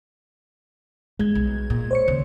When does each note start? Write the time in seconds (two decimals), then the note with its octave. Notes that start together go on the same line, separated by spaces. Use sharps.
1.19 G2 G#3 G#6
1.35 B1
1.70 A#2
1.91 C5 C#5 C#7
2.08 D#2 C#3